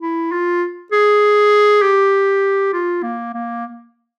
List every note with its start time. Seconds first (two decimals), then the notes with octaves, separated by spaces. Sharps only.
0.02 E4
0.32 F4
0.92 G#4
1.82 G4
2.73 F4
3.03 A#3
3.34 A#3